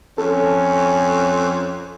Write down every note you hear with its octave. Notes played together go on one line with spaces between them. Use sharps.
F2 C#4 A4